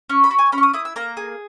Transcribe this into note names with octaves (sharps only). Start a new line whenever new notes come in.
C#4 C#6
B5
F#4
G#5
C#4 B5
C#6
D#6
E4 D#6
E6
A#3 A#5
G#4